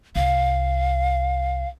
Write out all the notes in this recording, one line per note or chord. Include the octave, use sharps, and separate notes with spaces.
C2 F5